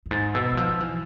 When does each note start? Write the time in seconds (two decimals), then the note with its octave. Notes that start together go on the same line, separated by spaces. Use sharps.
0.06 F2
0.11 G#2 A6
0.34 B2 E6
0.53 E3
0.57 F3
0.80 E3